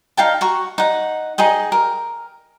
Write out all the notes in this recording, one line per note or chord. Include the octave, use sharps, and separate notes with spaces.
D#4 F5 G5 A5
F#4 A#5 C#6
D#4 F#5
D#4 G#4 D#5 G5
A#4